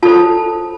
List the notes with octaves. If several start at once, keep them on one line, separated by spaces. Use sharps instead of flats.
F4 A4 C5 A5